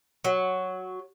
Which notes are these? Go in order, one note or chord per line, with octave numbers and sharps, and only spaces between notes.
F#3